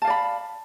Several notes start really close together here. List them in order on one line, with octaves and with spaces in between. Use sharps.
A5 F5 D5 B5